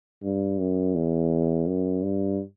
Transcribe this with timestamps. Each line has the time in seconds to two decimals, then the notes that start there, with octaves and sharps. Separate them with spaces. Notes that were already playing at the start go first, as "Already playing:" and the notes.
0.23 G2
0.59 F#2
0.95 E2
1.67 F#2
2.03 G2